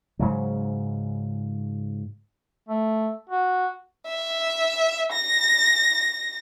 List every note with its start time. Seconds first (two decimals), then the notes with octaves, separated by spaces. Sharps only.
0.19 G#2 C#3 F#3
2.69 A3
3.30 F#4
4.07 E5
5.12 A#6